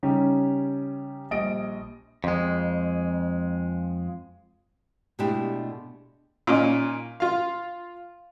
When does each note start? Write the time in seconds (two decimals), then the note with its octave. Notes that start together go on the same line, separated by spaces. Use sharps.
0.03 C#3 G3 C#4 D#4 G4
1.31 A#1 G3 D#5 D#6 D7
2.24 F2 G#3
5.19 B2 G#3 A3 D4 E4 G4
6.47 A#2 C#4 D#4
7.20 F4 F5